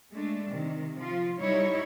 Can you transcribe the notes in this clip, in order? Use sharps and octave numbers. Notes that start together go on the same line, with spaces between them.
G#3 A3 D4
C3 D#3
F3 F4
F#3 G3 D#4 E4 C#5